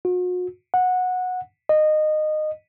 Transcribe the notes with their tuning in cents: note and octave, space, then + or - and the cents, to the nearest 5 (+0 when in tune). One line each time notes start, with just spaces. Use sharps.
F#4 -40
F#5 -15
D#5 -20